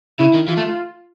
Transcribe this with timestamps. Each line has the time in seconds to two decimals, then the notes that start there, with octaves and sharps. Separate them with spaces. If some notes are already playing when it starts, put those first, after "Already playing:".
0.19 C#3 E4
0.34 D#3
0.48 E3 F4
0.57 A3